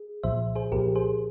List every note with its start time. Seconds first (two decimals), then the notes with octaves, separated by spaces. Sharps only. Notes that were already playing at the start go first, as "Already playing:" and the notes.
Already playing: G#4
0.23 C2 A#2 F3 C5 E5
0.55 G#4 C5
0.72 C2 A#2 F3 G4 A#4
0.96 G#4 C5